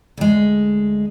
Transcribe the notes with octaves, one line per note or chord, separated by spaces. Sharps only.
D2 G#3